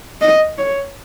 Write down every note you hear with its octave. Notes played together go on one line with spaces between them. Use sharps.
D#5
C#5